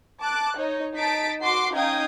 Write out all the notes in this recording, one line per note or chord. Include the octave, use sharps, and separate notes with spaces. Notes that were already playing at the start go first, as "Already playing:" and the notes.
A5 D6 F#6
D#4 C#5
D#4 A5 A6 B6 D7
F#4 C6 D6 C7
C#4 D#4 F5 G5 D#6 G#6